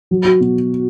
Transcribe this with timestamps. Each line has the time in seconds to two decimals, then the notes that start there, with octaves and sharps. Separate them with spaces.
0.11 F#3
0.25 F#4
0.40 B2